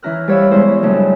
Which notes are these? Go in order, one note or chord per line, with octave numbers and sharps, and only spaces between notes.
E3 C#4 E4 A#5 F6 F#6
G3 C5 C#5 F5 B5 E6
E2 G#3 E4 C5
F#2 C#3 F#3 G3 A3 D4